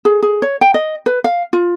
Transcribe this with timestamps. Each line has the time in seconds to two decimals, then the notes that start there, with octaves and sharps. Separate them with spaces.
0.05 G#4
0.23 G#4
0.42 C#5
0.61 G5
0.74 D#5
1.06 B4
1.24 F5
1.53 F4